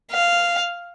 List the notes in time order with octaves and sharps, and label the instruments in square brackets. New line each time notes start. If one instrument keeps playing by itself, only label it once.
[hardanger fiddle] F5